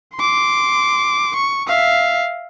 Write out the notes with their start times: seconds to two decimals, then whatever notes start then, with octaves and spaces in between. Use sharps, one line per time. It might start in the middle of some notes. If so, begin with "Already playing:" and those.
0.16 C6 D6
1.36 C#6
1.67 E5 F5